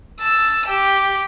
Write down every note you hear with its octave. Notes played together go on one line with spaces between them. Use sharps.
A5 E6
G4